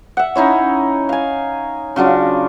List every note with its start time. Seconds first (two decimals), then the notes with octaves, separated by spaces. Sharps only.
0.17 E5 F#5
0.35 C#4 D#4 E4 C#5
1.09 F5 G#5
1.96 C#3 F#3 D4 F4